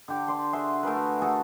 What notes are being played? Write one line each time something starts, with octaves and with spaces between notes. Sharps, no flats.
D3 G4
D5 C6
F#4 G#4 E5 C6
A3 G#4 A#4 B4
F#4
F#4 G#4 A4 F#5